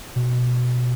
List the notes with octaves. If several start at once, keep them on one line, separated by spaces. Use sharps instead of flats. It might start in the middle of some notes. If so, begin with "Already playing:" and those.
B2